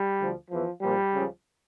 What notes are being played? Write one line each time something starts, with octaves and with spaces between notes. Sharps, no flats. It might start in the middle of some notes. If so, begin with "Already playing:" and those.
Already playing: G3
D2 D3 F3
E2 E3 F3
A#1 A#2 F3 G3
C#2 C#3 F3